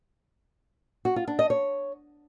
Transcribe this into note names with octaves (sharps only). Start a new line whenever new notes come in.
F#4
F4
D4
D#5
C#5